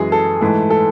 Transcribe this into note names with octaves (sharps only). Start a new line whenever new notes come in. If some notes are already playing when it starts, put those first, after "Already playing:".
Already playing: F#2 E3 G#3 G#4
A4
G#2 E3 A3
A4